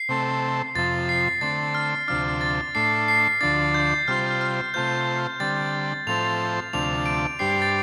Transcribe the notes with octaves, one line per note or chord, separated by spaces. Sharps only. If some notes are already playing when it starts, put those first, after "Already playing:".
Already playing: C7
C3 A3 C4 A4
F2 C3 F3 A6
C7
D3 A3 C4 A6
F6
D2 C3 F3 D4 F6
A6
A2 A3 D4 C7
C7
D2 D3 F3 D4 A6
G6
C3 G3 F4 C5 F6
F6
C3 A3 F4 C5 G6
D3 G3 C4 A6
A2 F3 C4 A4 C5 F7
D2 C3 F3 A3 D4 F7
D7
G2 G3 D4 G4 C5 C7
A6